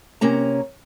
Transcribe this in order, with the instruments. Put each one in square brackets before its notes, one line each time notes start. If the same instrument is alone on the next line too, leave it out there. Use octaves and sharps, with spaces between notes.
[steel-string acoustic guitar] C3 A#3 C#4 A#5